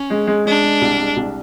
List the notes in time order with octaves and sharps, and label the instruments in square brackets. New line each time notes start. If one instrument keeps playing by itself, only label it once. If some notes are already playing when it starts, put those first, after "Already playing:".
Already playing: [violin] C#4
[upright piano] G#3
G#3
[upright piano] G#3 [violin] D4
[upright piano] G#3
C2
G#3
C2